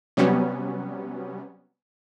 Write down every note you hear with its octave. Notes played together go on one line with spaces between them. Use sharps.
C3 F#3 G3 B3 C#4